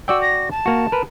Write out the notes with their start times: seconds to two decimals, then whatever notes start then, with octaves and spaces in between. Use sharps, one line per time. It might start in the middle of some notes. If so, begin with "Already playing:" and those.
0.08 F#4 D5 G5 E6
0.22 A#6
0.51 A5
0.66 A#3 F#4
0.92 A#4 B4